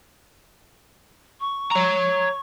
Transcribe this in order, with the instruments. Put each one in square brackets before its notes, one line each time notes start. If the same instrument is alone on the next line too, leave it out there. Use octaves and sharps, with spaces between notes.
[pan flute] C#6
[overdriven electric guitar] C#5 A#5